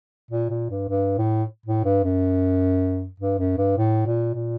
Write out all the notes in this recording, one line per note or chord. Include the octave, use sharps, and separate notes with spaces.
A#2
A#2
G2
G2
A2
A2
G2
F#2
G2
F#2
G2
A2
A#2
A#2